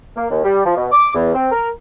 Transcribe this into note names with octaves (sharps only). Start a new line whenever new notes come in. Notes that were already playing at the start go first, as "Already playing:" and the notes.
A#3
D#2
G3
F3
B2
D6
E2
C4
A#4